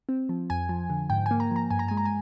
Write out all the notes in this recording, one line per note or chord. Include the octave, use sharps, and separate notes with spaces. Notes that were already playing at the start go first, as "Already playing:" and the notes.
C4
F3
F2 G#5
F3
D3
G#2 G5
A#3 G#5
A#5
F3 A#5
G2 G#5
A#5
G#3 G#5
A#5
G#5